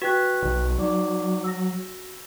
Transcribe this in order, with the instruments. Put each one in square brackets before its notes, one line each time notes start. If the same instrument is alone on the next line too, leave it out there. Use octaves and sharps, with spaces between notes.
[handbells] F#4 [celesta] B4 G5 F#6
[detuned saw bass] B1
[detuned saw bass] F#3 [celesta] D#4 D5 D6
[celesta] E6 A#6